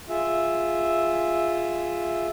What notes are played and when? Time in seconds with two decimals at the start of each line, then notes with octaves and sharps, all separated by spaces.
0.09 F4 G#4 E5